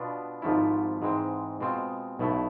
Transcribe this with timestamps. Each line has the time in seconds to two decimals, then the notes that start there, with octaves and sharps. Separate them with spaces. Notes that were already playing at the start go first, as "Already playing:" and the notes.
Already playing: B2 B3 D4 F4
0.42 G#1 G#2 F3 A3 E4
1.02 G#2 E3 G#3 C4
1.61 B2 G#3 C4 F4
2.19 B1 B2 A3 E4